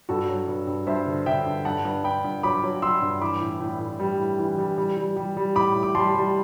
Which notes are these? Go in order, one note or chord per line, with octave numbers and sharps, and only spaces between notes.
G2 F#4 A4
F#3
G2
G2
G2 C5 E5
D3
D3 E5 G5
G2
G2 F#5 A5
G2
G2 G5 B5
G2
F#3 B5 D6
F#3
F#3 C6 E6
G2
E3 B5 D6
A2
A2
A2
G3
A2
E3
G3
G3
G3
G3
G3
A2 B5 D6
A2
D6
G3 A5 C6
G3